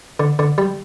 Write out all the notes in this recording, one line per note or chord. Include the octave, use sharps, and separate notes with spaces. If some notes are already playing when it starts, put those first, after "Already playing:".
D3
D3
G3